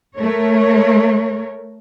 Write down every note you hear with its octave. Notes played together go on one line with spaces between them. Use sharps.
A3 A#4 C#5